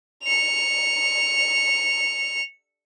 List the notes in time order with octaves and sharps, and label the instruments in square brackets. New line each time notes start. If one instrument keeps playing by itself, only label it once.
[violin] C#7 F7